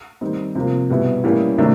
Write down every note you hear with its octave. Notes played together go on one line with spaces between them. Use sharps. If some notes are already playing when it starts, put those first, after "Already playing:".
D#3 G3 C4 D#4
C3 F3 A#3
B2 G3 B3 E4
A2 E3 G3 A#3 C#4
C3 D#3 F#3 A3 D4